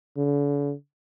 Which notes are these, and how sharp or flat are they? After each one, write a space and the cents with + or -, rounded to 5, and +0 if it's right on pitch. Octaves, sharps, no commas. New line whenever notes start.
D3 -45